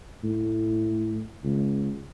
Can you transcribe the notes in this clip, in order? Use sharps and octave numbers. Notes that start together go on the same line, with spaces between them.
A2
C#2